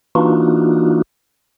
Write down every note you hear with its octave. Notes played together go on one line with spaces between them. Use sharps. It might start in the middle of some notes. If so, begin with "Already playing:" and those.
E3 A#3 D4 D#4 F4 F#4